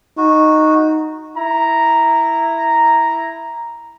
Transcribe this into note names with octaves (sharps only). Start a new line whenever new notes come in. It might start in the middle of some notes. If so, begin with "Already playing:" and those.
D#4 F#4
E4 A#5